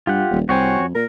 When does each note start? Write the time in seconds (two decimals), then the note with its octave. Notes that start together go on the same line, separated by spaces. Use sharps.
0.07 G2 F4 G4 F#5
0.31 D#1
0.49 C2 C4 F#4 C#5 G#5
0.79 F2
0.95 A#2 A#4